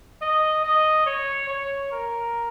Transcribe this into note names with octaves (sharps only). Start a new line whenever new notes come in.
D#5
D#5
C#5
C#5
A#4